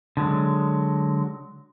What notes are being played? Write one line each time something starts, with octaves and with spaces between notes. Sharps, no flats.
D3 F#3 G#3